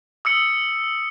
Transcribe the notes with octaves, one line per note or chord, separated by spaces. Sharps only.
D#6 E6 C#7